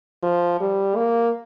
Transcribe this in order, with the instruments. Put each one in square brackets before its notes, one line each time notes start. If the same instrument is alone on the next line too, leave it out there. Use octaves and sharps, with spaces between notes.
[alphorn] F3
G3
A#3